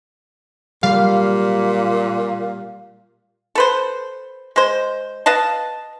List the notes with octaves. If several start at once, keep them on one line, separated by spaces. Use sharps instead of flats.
A#2 G3 F5
A4 B4 C5
G#3 C5
B4 D#5 F5 A5